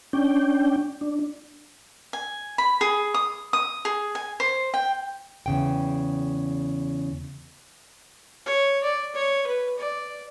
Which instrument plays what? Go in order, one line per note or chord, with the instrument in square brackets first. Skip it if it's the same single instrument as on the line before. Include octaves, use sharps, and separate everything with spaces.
[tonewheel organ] C#4 D4 G5
D4
[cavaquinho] G#5
B5
G#4
D#6
D#6
G#4
G#5
C5
G5
[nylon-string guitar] E2 C#3 G5
[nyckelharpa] C#5
D5
C#5
B4
D5